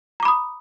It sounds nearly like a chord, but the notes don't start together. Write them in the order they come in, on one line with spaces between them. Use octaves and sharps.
A#5 D6 B5 D#6